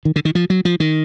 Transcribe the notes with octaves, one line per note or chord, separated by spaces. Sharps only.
D#3
D3
D#3
F3
F#3
F3
D#3